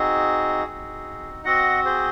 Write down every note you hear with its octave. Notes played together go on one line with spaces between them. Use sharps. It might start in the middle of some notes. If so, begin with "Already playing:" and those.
Already playing: C4 D#4 F#4 G#4
C4 D#4 F#4
C4 F#4 D#5 F#5
G#4 C5